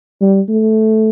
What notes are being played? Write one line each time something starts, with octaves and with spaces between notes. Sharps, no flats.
G3
A3